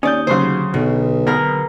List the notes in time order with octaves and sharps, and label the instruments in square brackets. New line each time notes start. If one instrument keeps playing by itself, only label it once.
[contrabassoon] D#2 [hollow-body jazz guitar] C#4 C#5 D5 [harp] D#6 G6
[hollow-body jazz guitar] D2 F#3 [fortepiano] C#3 C5 [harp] G#4 C6
[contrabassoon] B1 [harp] B2
[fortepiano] B2 [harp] G#4 A#4